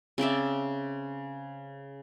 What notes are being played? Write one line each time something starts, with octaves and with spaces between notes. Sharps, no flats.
C#3 C4 D5 E5